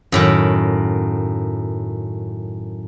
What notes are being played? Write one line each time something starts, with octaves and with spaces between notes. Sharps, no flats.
F#2 A2 D#3